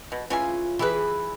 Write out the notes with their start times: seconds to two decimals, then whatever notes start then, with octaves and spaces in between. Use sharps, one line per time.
0.12 B2
0.30 C#3 E3 C#4 F4 G#5
0.79 E3 E4 G4 G#4 B4